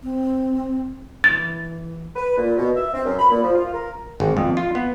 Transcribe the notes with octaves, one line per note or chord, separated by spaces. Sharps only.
C4
E3 A6
B4
A#2
B2
E5
C4
F#2
B5
A#2
F3
F4
A#4
G#1
F2
F4
B3